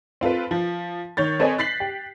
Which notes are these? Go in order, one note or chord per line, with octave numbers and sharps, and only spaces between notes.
C4 F4 A4 B4
F3
D#3 C#5 G6 A6
C4 A4 B4 C#5 D#5 G#5
F#6 A6 B6 C7 F#7
G4